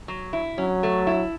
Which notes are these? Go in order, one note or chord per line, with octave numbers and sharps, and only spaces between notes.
F#3
E4
F#3 C#4
A3
E4